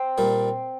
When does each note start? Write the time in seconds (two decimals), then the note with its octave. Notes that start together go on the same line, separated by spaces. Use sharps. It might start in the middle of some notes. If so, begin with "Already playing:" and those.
Already playing: C4
0.18 A#2 G3 A#3